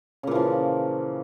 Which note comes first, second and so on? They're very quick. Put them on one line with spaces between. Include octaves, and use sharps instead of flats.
C#3 A#2 E3 F3